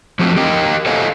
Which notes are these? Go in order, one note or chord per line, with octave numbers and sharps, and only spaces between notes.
F3 F#3 A3 C4
G4 A#4 D#5 G5
A4 C5 C#5 D#5 F5 G#5